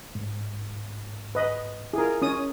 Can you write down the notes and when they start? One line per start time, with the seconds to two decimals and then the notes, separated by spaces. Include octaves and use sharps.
0.15 G#2
1.35 B4 D#5
1.93 E4 F4 G#4 A#4
2.22 C#4 D#6